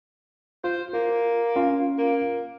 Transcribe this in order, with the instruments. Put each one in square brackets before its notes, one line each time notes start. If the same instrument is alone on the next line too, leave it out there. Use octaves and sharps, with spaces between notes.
[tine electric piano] F4 [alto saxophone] C5
[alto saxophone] A#3 [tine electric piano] F4
[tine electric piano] C#4 F4 F5
[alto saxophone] A#3